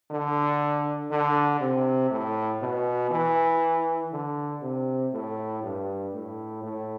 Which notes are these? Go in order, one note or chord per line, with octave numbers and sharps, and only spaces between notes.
D3
D3
C3
A2
B2
E3
D3
C3
A2
G2
A2
A2